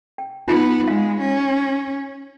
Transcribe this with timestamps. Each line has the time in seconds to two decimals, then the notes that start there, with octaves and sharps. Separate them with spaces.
0.18 G5
0.48 B3 D#4 F4
0.88 G#3 F5
1.21 C#4